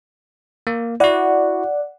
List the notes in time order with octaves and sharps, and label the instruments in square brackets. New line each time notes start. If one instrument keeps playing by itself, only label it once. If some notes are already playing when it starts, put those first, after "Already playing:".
[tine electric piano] A#3
[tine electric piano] E4 F#4 [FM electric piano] D5 F#5